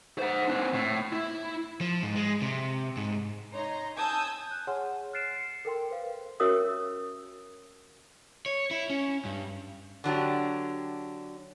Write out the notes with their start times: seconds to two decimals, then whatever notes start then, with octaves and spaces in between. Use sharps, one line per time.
0.19 C5 F#5
0.47 C4 D4
0.74 A2
1.13 E4
1.81 F3
2.03 G#2
2.16 G#3
2.42 C3
2.97 G#2
3.52 D#4 C#5 A#5 C6
3.95 G#5 A5 D#6 E6 G6 G#6
4.47 F#6 G6
4.67 G#4 C#5 F#5 G#5 C6 F6
5.13 F6 F#6 A6 C7 D7 E7
5.36 C7 C#7
5.65 A4 A#4 G5 C6
5.90 B4 C5 F5
6.40 C#4 F#4 A#4 C#5 E5 D#6
8.46 C#5
8.71 E4
8.90 C#4
9.25 G2
10.04 D3 F#3 D4 G4